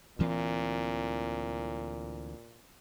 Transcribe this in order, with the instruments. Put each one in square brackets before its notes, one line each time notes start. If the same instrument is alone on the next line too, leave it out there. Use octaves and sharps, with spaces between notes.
[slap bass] D2 E3 C4 [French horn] A#2